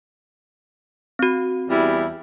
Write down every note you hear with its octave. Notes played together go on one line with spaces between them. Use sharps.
C4 F#4
E2 G3 E4